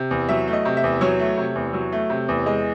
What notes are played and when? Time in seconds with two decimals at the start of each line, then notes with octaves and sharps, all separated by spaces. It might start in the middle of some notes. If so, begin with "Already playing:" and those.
Already playing: C3
0.11 E2
0.29 F#3 E5
0.47 A3
0.53 D#5
0.65 C3
0.77 E5
0.84 E2
1.01 F#3 C#5
1.19 A3
1.37 C3
1.55 E2
1.73 F#3
1.92 A3
2.10 C3
2.28 E2
2.46 G#3 D#5